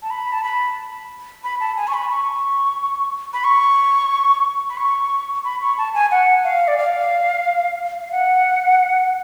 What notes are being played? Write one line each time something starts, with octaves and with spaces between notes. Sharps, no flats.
A5
B5
A5
B5
B5
A5
G#5
C#6
B5
C#6
B5
C#6
B5
C#6
B5
C#6
A5
G#5
F#5
F5
D5
F5
F5
F#5